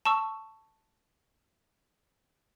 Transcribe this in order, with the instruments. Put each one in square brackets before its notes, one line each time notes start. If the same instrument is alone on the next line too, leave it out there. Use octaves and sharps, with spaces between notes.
[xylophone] A5 C#6 E6